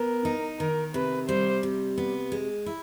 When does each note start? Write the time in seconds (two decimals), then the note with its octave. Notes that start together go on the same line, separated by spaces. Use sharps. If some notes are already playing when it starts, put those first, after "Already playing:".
Already playing: B3 A#4
0.25 D#4
0.59 D#3 A#4
0.94 C3 B4
1.29 G3 C5
1.63 C3
1.98 B3
2.32 G#3
2.66 E4